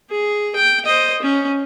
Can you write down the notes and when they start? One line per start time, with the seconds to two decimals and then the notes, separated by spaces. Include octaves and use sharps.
0.10 G#4
0.56 G5
0.86 C5 D#5
1.22 C#4